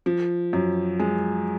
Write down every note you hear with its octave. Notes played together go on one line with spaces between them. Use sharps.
F3
F#2
G#3